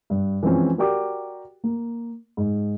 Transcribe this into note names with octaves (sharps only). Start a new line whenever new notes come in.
G2
E3 F3 G#3 C4 C#4
F#4 G4 A#4 D5 G5 D6
A#3
G#2